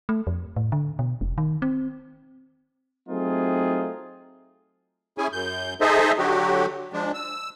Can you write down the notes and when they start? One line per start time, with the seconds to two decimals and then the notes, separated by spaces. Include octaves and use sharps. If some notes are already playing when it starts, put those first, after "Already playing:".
0.09 A3
0.27 F2
0.56 A2
0.72 D3
0.99 B2
1.21 F1
1.38 D#3
1.62 C4
3.09 F#3 A3 C4 D#4 F4 G#4
5.18 C#4 E4 G#4 G#5
5.33 F#2 G6
5.81 D#4 G#4 A4 C5 D#5 E5
6.18 D3 F#3 F#4 G4
6.93 F3 G#3 D4
7.14 E6